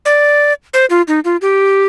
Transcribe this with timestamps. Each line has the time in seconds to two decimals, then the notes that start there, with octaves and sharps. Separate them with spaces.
0.06 D5
0.74 C5
0.90 F4
1.08 D#4
1.25 F4
1.42 G4